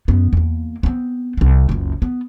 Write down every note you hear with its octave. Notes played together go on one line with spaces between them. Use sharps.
F#2 B3
E2 A#3
B3 C4
C2 C4
F#1 C#2
B3